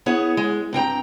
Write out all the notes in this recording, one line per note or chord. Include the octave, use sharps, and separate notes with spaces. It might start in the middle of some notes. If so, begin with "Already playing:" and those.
B3 E4 G#4 C#5
G#3
G2 C4 G5 A#5